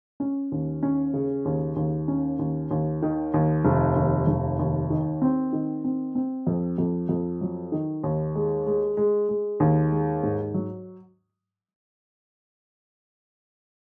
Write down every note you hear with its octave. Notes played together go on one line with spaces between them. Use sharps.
C#4
D#2
C#4
C#3
D#2
D#2
C#4
D#2
D#2
D#3
D#2
F1
D#2
F1
D#2
D#3
C4
D#3
C4
C4
F2
F2
F2
F#3
D#3
D#2
G#3
G#3
G#3
G#3
D#2
G#3
G#2
F#3